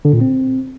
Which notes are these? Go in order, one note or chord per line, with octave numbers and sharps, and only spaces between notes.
D3
A#2
C4